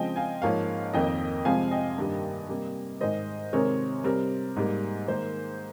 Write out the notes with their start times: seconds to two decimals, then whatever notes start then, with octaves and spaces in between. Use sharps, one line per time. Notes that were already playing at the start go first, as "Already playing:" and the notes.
Already playing: C#3 F3 G#3 C4 D#5 G5
0.16 F5 G#5
0.42 G#2 F3 A#3 C#5 F5
0.93 F2 D#3 A#3 D#5 G5
1.45 C3 F3 G#3 C4 F5 G#5
1.71 D#5 G5
1.98 G2 D#3 G3 A#3
2.49 C3 G3 A#3
3.01 G#2 D#3 G#3 C5 D#5
3.53 C3 D#3 G#3 C4 A#4 C#5
4.04 C3 G3 C4 A#4
4.56 G#2 G3 A#3
5.08 G#2 D#3 A#3 C5